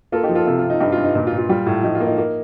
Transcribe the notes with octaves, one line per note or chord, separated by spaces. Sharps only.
A#3 F4 A4
D#4 G4
F3
F4 A4
C3 F4 A4
F4
C3
D#4
G2 D#4 G4
F4
G2
D#4
A#2 D#4
F4
A#2
F4
G3 F4
A2
F3 D#4
F4
A#3
D#4
A#3